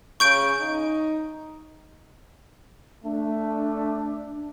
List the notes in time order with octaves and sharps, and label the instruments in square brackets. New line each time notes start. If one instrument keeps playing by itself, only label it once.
[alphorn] C#3 [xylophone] C#6 G6 D7
[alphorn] D#4
[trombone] A3 [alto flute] D4